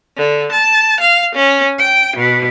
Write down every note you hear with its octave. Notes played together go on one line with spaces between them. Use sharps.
D3
A5
F5
C#4
G5
B2